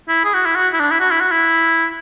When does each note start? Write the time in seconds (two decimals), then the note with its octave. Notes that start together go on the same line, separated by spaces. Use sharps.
0.09 E4
0.24 G#4
0.34 F#4
0.46 E4
0.56 F#4
0.74 E4
0.80 D4
0.91 E4
1.00 F#4
1.11 E4
1.20 F#4
1.31 E4